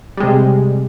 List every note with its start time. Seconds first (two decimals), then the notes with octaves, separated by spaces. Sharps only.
0.17 G3
0.20 G#3
0.23 C3